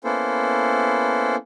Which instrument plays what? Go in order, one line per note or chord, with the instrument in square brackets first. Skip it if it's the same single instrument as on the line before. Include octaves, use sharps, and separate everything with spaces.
[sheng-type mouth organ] A#3 B3 C#4 E4 A4 C5